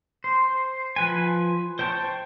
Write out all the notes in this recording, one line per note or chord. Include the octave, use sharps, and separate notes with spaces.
C5
F3 B4 G#5
C5 G5 A5 C#6